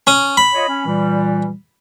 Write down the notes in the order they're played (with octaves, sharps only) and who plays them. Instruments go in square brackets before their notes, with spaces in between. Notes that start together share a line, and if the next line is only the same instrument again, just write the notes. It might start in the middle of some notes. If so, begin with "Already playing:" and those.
[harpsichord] C#4 D#6
B5
[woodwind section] F4 C#5 D#5
C#4
A#2 E3 G3